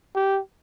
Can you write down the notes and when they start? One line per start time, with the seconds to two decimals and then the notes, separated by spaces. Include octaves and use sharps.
0.15 G4